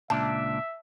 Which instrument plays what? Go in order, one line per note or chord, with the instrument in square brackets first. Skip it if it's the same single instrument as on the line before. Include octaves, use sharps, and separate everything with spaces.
[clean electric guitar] C#2 A#2 D4 [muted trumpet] E5 [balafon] A5